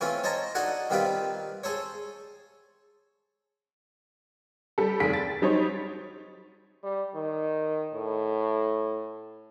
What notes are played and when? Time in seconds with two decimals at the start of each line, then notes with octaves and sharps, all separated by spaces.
0.01 E3 A3 C4 C#4 F4
0.24 C5 C#5 D#5 A5 A#5
0.55 D4 D#4 F#4 A4 F#5 G#5
0.90 D#3 G3 C4 F4 G4 B4
1.63 G#4 A4 C5 C#5
4.78 G3 A4
5.00 F1 D#2 G#4 B6 D7
5.13 A6
5.42 F#3 G3 D#4 C5 C#5
6.83 G3
7.15 D#3
7.93 A2